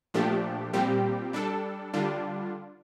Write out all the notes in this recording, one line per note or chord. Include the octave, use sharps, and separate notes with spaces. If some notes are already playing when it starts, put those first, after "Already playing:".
A#2 F3 A3 D4 G4
A#2 G3 C4 G4
G3 D4 A4
D3 G3 D4 F4